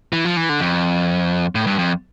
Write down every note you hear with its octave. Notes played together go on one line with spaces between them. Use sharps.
E3
F3
E3
D3
F2
A2
G2
F2